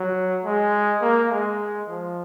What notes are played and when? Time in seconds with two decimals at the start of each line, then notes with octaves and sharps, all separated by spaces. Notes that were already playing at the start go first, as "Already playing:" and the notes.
Already playing: F#3
0.44 G#3
1.02 A#3
1.31 G#3
1.89 F3